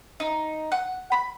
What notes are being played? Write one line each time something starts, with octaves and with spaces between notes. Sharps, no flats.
D#4
F#5
B5